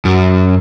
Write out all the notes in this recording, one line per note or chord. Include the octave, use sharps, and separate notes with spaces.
F#2